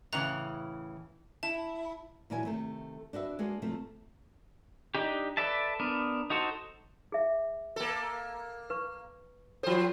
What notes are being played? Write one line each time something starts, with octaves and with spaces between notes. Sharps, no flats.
A2 C#3 E3 A#5 F#6
E4 A5
A#2 E3 F#3 E4 G#5
C3 D#3 A3
D4 F#4 B4 E5
G#3 A#3 D4 F#4 G#4
C3 F3 A3
D4 D#4 G4
A4 B4 D5 E5 A5
B3 D4 A#4
D#4 F#4 A4 C5
G#4 E5
A#3 A4
B4 C#6
F3 F4 A4 C5